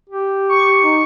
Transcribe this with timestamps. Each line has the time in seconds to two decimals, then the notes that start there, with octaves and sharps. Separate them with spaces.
0.09 G4
0.49 C#6
0.83 D#4